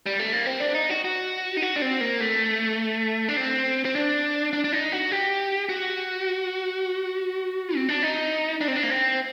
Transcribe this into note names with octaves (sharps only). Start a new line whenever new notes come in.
G3
A3
A#3
C4
D4
D#4
F#4
F#4
D#4
F#4
D4
C4
A#3
A3
D4
C4
C4
D4
D4
D4
D#4
F#4
G4
F#4
C4
D4
D#4
D4
C4
D4
A#3
C4